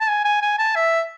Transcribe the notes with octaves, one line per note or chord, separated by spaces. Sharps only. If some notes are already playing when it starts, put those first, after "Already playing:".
A5
G#5
G#5
G#5
A5
E5